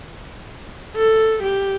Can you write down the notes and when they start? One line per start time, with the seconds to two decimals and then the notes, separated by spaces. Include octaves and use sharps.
0.96 A4
1.43 G4